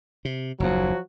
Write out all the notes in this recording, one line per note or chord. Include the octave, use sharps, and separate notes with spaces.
C3
F#1 D#2 F3 F#3 F#4